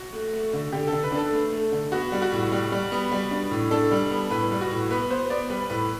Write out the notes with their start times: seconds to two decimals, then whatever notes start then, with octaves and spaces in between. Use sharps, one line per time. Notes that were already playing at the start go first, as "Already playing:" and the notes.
Already playing: F#4
0.13 A3
0.33 A3
0.53 D3
0.72 D3 G4
0.87 A4
0.92 D3
1.03 B4
1.12 D4
1.17 A4
1.32 A3
1.52 A3
1.72 D3
1.92 B3 F#4
2.12 G3
2.22 F#4
2.32 A2
2.52 G3
2.72 G3
2.92 B3
3.12 G3
3.31 D4
3.51 A2
3.71 D4 A4
3.91 G3
4.11 B3
4.30 A2 B4
4.51 G3
4.61 F#4
4.71 A2
4.90 B3 B4
5.10 B3 C5
5.30 B3 D5
5.50 G3 B4
5.70 A2 B4